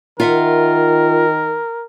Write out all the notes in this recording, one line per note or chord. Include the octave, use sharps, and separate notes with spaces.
D#3 F4 A#4 E5 F#5